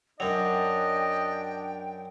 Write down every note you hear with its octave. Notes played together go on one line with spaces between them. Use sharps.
F#2 F#3 D4 D#5 G5